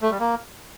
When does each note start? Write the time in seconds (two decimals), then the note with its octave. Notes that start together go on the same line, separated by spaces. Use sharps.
0.02 A3
0.11 G3
0.20 A#3